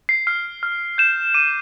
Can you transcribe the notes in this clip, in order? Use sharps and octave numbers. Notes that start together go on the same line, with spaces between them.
C7
F6 C7
F6
G6 E7
D6 D#7